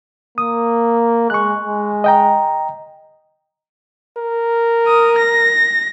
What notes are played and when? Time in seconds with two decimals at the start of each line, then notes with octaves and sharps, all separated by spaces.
0.38 A#3 D#6
1.30 G#3 C#6 F#6
1.65 G#3
2.04 D#5 G5 A#5
4.18 A#4
4.87 D#6
5.18 A#6